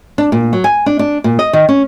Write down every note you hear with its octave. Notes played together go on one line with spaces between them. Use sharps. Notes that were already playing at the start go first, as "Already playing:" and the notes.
D4
A#2
F#3
G#5
D4
D4
A#2
D#5
D#3
C#4